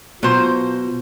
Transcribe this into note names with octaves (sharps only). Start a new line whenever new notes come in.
B2 F#3 F4 C5